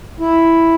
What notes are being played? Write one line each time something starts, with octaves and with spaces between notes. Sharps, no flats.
E4